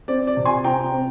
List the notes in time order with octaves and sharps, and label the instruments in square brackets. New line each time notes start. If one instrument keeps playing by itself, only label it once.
[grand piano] C4 [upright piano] D5
[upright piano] D5
[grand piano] C3
[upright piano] G#5 C6
[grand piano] C4 [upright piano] G5 A#5
[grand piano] C4